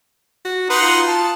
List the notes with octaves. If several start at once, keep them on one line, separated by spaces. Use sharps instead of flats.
F#4
D#4 B4 F#5 C6
F4
A5